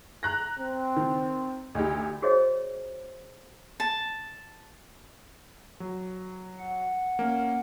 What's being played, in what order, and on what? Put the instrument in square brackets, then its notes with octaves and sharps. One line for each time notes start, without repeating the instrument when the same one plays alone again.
[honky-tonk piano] A#5 F#6 A#6
[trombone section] C4
[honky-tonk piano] D#3
D2 D#4 G4
[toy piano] F#4 G#4 C5 C#5 D#5
[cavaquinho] A5
[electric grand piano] F#3
[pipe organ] F#5
[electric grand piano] A#3 C#4